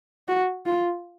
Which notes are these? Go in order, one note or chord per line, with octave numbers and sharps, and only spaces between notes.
F#4
F4